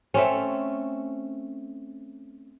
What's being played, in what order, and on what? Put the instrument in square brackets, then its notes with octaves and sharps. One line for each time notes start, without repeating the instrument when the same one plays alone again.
[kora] A3 C4 C#4